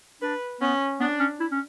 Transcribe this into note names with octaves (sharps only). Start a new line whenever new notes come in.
D4 B4
B3 C#4
B3 D4
C#4
E4
C#4